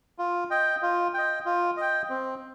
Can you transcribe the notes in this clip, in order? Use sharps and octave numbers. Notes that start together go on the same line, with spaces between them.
F4
D#5 G5
F4
D#5 G5
F4
D#5 G5
C4